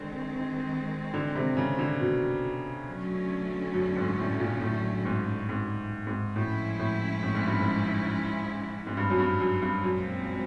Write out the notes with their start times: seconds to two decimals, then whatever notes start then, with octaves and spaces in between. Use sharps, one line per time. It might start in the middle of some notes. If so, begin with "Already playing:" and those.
Already playing: D3 D#3 G#3 C4
1.14 D3
1.35 C3
1.57 C#3
1.79 D3
2.00 B2
2.87 D3 F#3 A3 C#4
3.74 F#2
3.96 G#2
4.18 A2
4.40 A#2
4.61 A2
5.05 G#2
5.49 G#2
6.07 G#2
6.36 A2 F3 G#3 C#4 E4
6.79 A2
7.23 A2
7.35 G#2
7.48 G2
7.60 G#2
8.87 G#2
8.97 G2
9.10 F#2
9.19 G2
9.40 F#2
9.62 G2
9.84 F#2 A#2 F3 G#3 C4